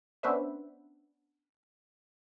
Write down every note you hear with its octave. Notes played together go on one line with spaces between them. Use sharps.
B3 C#4 D4 B4 C5 E5